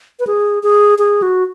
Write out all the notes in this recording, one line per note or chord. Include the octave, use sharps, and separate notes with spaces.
B4
G#4
G#4
G#4
F#4